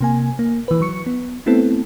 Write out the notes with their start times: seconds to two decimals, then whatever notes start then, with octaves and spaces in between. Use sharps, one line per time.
0.01 C3 A#3 G#5
0.39 A#3
0.68 E3 B4
0.81 F#3 C#6 C#7
1.06 B3
1.46 A3 B3 C4 E4 A4